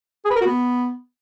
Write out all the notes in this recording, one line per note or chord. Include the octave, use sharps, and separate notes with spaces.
G#4
B4
A#4
F#4
B3